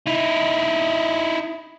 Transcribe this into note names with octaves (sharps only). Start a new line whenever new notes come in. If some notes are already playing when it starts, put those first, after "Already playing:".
D#4 E4